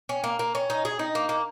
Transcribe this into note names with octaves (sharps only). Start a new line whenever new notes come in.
C#4
A#3
A#3
C#4
D#4
G#4
D#4
A#3
A#3